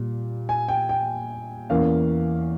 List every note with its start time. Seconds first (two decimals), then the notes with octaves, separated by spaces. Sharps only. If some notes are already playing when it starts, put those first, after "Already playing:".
Already playing: A#2 G3
0.49 G#5
0.68 G5
0.89 G5
1.69 E2 E3 A#3 C#4 F5